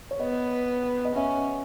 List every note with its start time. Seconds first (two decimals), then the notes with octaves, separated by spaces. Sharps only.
0.11 C#5
0.20 B3 D#5
0.83 F#5
1.05 D#5
1.15 C#4 E5